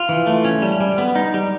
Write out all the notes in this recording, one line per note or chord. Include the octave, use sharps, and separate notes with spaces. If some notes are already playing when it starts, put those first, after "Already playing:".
Already playing: F4
E3
A3
C#4
G3
G3
B3
D#4
G3